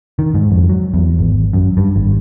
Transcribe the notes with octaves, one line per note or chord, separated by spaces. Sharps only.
D#3
G#2
F2
F#3
E2
G#1
F#2
G2
G#1